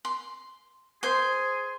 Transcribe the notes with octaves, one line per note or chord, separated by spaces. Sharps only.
C6
G#4 C5 C6